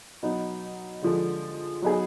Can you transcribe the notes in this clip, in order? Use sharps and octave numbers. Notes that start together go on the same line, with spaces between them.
B2 F#3 B3 D#4
D3 F3 G#3
F#3 B3 D#4 G#4